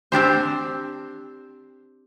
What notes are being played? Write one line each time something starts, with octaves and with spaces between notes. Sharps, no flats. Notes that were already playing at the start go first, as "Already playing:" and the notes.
C4 D4 G4 C5